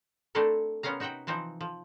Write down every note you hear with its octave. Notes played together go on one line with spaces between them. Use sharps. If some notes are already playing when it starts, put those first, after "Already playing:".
A3 C4 D4 E4 A4 A#4
C3 B3 C#4 A#4 F5 A#5
D#4 F#4 E5 F#5 G5
E3 F3 C4 D#4
F3